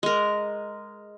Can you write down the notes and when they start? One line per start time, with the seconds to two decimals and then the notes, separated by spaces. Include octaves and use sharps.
0.03 G#3 A#4